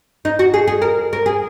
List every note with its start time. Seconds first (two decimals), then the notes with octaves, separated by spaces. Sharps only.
0.25 D#4
0.39 F#4
0.54 G#4
0.67 G#4
0.82 A#4
1.13 A#4
1.26 G#4